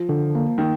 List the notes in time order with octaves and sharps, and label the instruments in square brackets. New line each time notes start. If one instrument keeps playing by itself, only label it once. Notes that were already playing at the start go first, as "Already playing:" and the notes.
Already playing: [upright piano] F3
[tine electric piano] D3
A#3
[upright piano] D#3